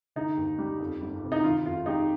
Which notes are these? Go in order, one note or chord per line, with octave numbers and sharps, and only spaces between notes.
D3 D#4
D#2
G3
F2
G1
C3
D#4
D#3 F4
F2 F4
G3 D#4 G4